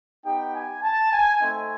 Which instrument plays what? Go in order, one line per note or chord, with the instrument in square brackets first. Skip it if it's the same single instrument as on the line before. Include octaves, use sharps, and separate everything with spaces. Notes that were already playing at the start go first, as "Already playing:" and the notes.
[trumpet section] B3 D#4 G4 G5
G#5
A5
G#5
A3 C4 D#4 G#5